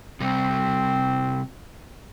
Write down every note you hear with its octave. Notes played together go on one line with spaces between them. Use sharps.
C3 G3 C4